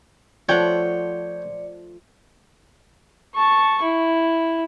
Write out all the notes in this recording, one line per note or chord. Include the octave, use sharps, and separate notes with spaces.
F3 A3 C#5 D5 F#5 G5 C#7
A5 C#6
E4